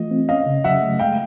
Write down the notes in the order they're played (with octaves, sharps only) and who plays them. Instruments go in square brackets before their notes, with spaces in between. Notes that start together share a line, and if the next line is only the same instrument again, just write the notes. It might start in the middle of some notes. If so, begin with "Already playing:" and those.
Already playing: [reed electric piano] E3 A3 F4 [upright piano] D#5
[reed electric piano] C4
[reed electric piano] C#4 [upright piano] D#5 F5
[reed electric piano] C#3
[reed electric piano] F#3 [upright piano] E5 F#5
[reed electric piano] A3
[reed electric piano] G#3 [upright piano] F5 G5